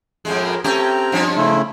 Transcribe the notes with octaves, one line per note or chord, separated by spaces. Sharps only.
F2 A2 G#3
A#4
A3 C4 C#4 G4 A#5
G2 F3 C#4
C#3 A3 E4